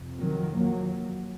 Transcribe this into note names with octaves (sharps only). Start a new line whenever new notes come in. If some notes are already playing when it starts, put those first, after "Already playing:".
Already playing: F2 C3
D#3 F#3
F#3 A#3